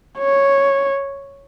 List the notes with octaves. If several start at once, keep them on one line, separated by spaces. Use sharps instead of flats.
C#5